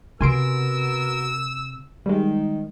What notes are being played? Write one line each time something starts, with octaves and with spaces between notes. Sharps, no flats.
C3 B3 F#4 A#4 G#5 C6 E6 D7
D#3 G3 G#3